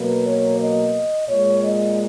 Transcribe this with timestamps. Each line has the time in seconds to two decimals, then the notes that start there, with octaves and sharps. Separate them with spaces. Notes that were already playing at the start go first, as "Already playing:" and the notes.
Already playing: B2 F#3 A#3 B4
0.24 C#5
0.58 D#5
1.28 A#2 G#3 C#5
1.62 D#5